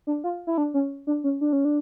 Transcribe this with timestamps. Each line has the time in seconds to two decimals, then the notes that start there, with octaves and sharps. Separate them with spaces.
0.07 D4
0.24 F4
0.47 E4
0.58 D4
0.74 C#4
1.07 D4
1.24 C#4
1.41 D4
1.53 C#4
1.65 D4